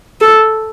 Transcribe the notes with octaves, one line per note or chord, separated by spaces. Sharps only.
A4